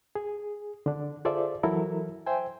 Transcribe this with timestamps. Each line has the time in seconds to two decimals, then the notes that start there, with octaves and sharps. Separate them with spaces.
0.15 G#4
0.86 D3 D4
1.25 F4 G#4 A4 C5 D5 E5
1.63 E3 F#3 E4 A4 A#4
2.26 C5 E5 G5 G#5